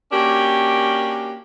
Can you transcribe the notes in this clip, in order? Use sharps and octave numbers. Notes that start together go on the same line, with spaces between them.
A#3 C#4 D4 F#4 G4 A#4